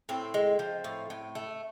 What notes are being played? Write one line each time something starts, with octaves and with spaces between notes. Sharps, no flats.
A2 C4
G#3
F3
A2
A2
A3